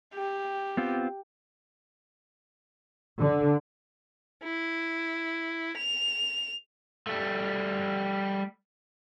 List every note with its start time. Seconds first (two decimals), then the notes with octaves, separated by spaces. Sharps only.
0.14 G4
0.77 B3 C4 F4
3.20 D3
4.43 E4
5.77 F7
7.07 G3 A3